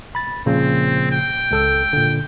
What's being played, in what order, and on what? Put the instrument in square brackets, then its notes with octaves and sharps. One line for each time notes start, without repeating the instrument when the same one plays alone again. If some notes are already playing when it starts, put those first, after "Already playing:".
[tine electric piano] B5 A6
[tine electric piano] A#2 C#3 F3 [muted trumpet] C4
[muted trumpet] G5
[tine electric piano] C#2 A4 E6
A#2 D3